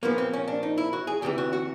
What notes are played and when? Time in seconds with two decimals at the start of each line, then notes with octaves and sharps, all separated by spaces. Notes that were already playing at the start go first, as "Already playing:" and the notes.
0.03 A#2 F3 A#3 B3
0.18 C4
0.33 C#4
0.48 D4
0.63 D#4
0.78 E4
0.93 F#4
1.07 G#4
1.22 D2 C3 E3 G4
1.38 F#4
1.53 F#4